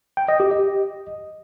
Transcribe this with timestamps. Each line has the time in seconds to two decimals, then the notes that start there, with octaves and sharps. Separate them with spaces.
0.17 G5
0.28 D#5
0.40 G4
0.51 D#5